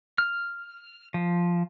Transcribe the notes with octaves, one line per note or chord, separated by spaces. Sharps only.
F6
F3